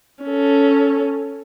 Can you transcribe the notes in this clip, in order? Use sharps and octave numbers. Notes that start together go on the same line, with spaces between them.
C#4 A4